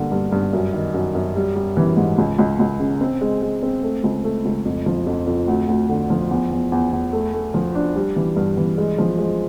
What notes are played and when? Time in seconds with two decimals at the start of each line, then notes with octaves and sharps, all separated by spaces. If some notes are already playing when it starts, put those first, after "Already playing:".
Already playing: G2 D3 A#3
0.12 G2
0.32 G2
0.53 F#2
0.73 D#3
0.94 F#2
1.15 F#2
1.36 G3
1.56 G3
1.77 E3
1.97 G#2
2.18 C#2
2.39 C#2
2.59 C#2
2.80 C#3
3.01 C4
3.21 G#3
3.42 G#3
3.63 C4
3.83 A3
4.04 C#2
4.24 A3
4.45 C#2
4.65 F2
4.86 F3
5.07 F2
5.27 F2
5.48 D2
5.69 D2
5.89 D3
6.10 F3
6.31 E2
6.51 E2
6.72 E2
6.93 E2
7.13 A3
7.34 A3
7.54 F3
7.75 D4
7.96 G3
8.16 E3
8.36 G2
8.57 E3
8.78 G#3
8.98 F3
9.19 G#3